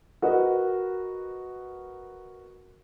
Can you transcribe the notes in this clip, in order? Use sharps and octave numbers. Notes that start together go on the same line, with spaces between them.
F#4 A#4 B4 D#5